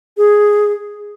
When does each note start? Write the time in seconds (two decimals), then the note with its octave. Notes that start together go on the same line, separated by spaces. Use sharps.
0.17 G#4